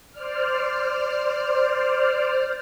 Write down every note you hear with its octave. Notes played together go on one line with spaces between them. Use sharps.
C5 D5 F6